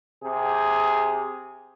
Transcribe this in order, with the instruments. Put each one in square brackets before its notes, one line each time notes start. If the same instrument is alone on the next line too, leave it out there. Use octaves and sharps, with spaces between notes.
[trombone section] C3 G4 G#4